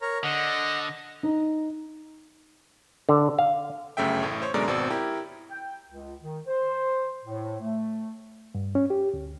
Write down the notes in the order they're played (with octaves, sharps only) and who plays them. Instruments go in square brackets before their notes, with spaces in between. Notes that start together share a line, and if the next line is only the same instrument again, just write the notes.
[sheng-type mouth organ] A#4 C#5 A#5
[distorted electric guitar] D3 [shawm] D#5 [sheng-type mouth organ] F#5
[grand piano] D#4
[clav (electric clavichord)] D3
F5
[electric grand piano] G1 F#2 C#3 A3 E5 G5
A1 A2
C5 C#5
F#2 B2 D3 G#3 A#4 D5
G#1 B2 C4 D5 E6
E4 G4 A#4
[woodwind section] G5
C#2
D#3
C5
A2
A3
[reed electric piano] G2
C#4
G4
D2